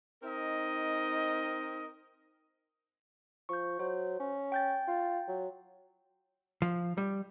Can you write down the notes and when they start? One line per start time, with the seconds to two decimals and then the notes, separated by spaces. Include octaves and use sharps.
0.23 C4 D#4 A#4 D#5
3.49 F3 C#6 G6
3.79 F#3 C5
4.20 C#4
4.52 G5 G6 A6
4.87 F4
5.28 F#3
6.62 F3
6.98 G3